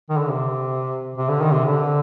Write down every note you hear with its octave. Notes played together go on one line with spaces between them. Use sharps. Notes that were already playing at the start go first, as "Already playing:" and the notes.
D#3
D3
C3
C3
D3
D#3
C3
D3